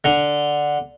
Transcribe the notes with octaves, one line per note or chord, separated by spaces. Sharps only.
D3